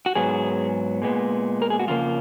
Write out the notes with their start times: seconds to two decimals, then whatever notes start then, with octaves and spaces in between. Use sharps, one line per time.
0.06 F#4
0.15 G#2 F#3 B3 G#4
1.02 A#2 G#3 B3
1.62 A#4
1.70 G#4
1.80 F#4
1.88 F2 C#3 F3 A#3 F4